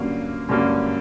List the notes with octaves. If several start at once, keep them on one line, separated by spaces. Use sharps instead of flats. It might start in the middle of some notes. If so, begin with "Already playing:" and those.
Already playing: G2 D3 F#3 A#3 C#4 F5
G2 D3 F#3 A#3 C#4